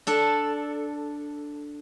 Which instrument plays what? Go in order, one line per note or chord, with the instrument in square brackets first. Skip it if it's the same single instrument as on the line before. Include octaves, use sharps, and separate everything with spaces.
[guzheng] D4 A4